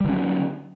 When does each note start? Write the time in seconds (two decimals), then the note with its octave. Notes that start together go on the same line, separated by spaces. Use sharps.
0.01 G3
0.05 D3
0.09 C#4
0.13 F#3